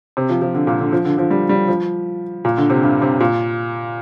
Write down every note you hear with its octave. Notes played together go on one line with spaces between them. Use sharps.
C3
F3
F3
D3
A#2
D3
F3
D3
F3
G3
G3
F3
A#2
D3
C3
G2
C3
A#2